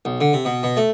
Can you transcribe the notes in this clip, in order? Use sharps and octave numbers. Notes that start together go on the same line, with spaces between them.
B1
D3
C3
B2
B2
A3